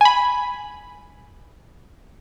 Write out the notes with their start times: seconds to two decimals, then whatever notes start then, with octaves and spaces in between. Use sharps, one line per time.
0.01 G#5 B5